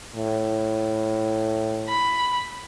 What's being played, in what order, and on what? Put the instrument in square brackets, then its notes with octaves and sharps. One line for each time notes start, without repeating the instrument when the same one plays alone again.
[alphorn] A2
[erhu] B5